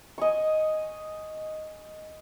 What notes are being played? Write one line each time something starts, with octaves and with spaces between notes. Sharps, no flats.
D#5 G#5 C#6